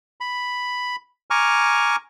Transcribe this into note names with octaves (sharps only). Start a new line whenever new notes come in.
B5
G#5 A#5 C#6 D6 F6